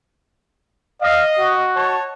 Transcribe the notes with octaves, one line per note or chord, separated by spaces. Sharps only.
D#5 F5
F#4
C#5 A5